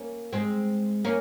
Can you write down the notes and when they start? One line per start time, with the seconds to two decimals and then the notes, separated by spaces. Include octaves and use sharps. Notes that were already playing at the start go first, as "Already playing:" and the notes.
Already playing: A#3 C#4
0.33 G#3 C4
1.05 A#3 C#4